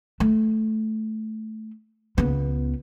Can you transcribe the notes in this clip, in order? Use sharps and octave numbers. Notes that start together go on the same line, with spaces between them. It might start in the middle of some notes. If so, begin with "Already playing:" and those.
A3
C#2 B3